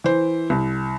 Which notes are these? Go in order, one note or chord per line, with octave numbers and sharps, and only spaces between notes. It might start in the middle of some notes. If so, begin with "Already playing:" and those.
E3 C5
C2